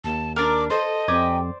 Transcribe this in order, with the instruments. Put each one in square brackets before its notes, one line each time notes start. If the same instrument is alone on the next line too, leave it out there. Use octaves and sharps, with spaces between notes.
[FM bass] D#2 [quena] A5
[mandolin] D4 A#4 [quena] D6
[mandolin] A4 [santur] C5 [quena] D#5
[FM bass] F2 [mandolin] G4 G#5 A#5 [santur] D5